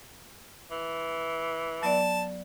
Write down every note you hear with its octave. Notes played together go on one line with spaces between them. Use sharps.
E3
F#3 B3 D5 A5